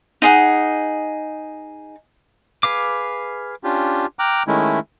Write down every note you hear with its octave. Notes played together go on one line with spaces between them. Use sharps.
D#4 G#4 F#5
G#4 B4 F5 D6
C#4 D4 F4 G4
G5 A#5 D6 F6 F#6
D#3 G#3 A3 C#4 E4